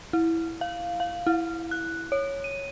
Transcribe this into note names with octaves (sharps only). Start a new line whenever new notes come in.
E4
F5
F5
E4
F#6
C#5
D#7